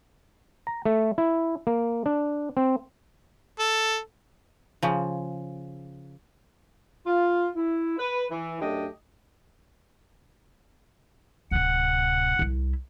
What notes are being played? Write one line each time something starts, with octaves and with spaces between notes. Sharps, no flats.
A#5
A3
E4
A#3
D4
C4
A4
C#3 F3
F4
E4
B4
E3
F#2 A3 D4 G4 D#5
D1 C3 F#5
C2 E4